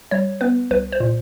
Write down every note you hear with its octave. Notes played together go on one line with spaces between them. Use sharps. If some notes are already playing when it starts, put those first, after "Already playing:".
G3 C#5
B3 B4
C2 B4
C5
A#2